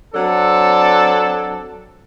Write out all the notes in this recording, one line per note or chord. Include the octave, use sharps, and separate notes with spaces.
F#3 C4 D4 A4